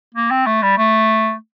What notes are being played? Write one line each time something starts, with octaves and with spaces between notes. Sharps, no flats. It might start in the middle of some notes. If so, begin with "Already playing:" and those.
A#3
C4
A3
G3
A3